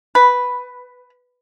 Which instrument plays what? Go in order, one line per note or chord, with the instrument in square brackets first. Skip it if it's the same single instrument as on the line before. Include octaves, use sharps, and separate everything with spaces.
[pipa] B4